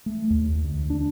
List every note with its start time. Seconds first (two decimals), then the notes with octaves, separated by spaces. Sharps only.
0.06 A3
0.30 D#2
0.64 D2
0.90 D4